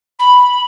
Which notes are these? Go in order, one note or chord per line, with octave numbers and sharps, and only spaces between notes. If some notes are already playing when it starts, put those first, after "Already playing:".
B5